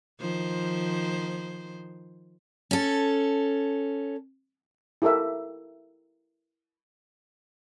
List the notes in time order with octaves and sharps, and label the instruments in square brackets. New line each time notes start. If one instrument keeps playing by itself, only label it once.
[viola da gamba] D#3 F3 C5
[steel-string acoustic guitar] C#4 A4
[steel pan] E4 G4 A4 A#4 E5